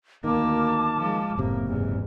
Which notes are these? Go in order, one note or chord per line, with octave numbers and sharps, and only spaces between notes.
D2 D#3 A#3 A5 D6
F3 G#3
F#1 A2 C3 A#3
E2 G#2